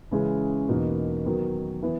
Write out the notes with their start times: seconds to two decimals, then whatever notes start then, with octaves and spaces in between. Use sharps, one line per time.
0.11 C#3 E3 G#3 C#4 G#4
0.68 E2 B2 A#3 D#4 A#4
1.25 D#3 F#3 B3
1.83 E3 B3